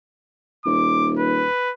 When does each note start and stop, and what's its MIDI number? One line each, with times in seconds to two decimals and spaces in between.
0.65 1.48 27
0.65 1.12 86
1.18 1.72 71